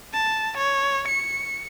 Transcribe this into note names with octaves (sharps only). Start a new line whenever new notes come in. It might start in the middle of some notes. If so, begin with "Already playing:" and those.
A5
C#5
C#7